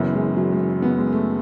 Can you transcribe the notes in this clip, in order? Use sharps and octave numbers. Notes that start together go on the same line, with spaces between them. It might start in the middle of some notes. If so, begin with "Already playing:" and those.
Already playing: F#1 F#2 E3 B3
G#3
F#3
G#3
B3
G#3
A3